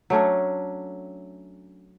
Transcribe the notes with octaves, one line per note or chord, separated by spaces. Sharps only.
F#3 A3 C#4 D4